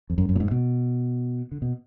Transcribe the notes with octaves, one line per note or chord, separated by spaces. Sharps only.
F2
F#2
F#2
A#2
G#2
B2
D3
B2